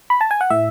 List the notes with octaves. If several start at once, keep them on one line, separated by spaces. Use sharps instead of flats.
B5
A5
G#5
F#5
A2 E5